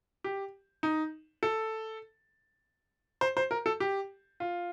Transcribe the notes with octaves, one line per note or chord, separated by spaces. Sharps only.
G4
D#4
A4
C5
C5
A#4
A4
G4
F4